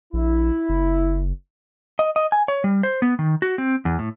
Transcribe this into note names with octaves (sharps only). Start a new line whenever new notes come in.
A#1 E4
F#1
D#5
D#5
G#5
C#5
G3
C5
B3
D#3
F#4
C4
E2
A2